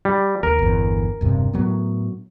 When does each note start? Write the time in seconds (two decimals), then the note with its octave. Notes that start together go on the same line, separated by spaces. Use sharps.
0.05 G3
0.43 D#2 A#4
0.59 G1 E2
1.21 E1 G2 C3
1.53 A2 F#3 B3